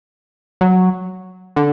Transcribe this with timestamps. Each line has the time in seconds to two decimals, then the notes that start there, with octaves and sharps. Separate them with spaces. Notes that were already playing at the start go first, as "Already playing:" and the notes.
0.61 F#3
1.56 D3